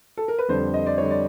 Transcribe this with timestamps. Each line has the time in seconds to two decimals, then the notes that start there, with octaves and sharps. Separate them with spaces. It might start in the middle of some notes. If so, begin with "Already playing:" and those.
0.17 A4
0.28 A#4
0.39 B4
0.49 F2 D3 G3 C5
0.74 D#5
0.87 D5
0.98 D3 G3 C#5
1.11 D5